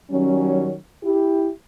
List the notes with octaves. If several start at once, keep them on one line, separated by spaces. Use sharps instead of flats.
D#3 F#3 G3 C#4
E4 G4